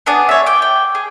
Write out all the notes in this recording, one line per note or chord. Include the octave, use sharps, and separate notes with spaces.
B3 D4 G#4 D5
C#5 E5
G5 D6
G5
G#4